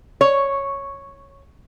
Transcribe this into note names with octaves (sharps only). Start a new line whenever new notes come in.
C#5